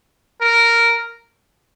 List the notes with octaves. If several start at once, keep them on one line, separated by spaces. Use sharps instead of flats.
A#4